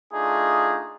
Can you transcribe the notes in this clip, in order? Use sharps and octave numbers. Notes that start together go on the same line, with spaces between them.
A3 D4 D#4 F4 G#4